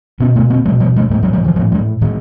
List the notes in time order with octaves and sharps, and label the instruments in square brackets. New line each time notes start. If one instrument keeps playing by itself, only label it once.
[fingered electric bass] B2 B3 C#4
A3 B3
A#3 C4
B2 F#3 G#3
F3 G3
G3 A3
A2 G3 A3
F#3 G#3
F3 G3
E3 F#3
A2 F3 G3
F#3 G#3
A2 D#3